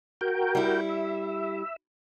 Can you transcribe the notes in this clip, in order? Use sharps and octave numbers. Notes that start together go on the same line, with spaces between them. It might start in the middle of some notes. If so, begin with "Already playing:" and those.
F#4 A#4 G5
G3 E4
E5